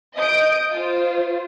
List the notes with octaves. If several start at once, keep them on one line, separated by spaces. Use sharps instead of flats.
D#5 D#6 G6 D7
F4 C5